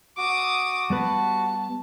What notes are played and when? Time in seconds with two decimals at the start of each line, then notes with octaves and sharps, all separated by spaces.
0.18 F#4 D6 D#6
0.90 G3 B3 B4 A5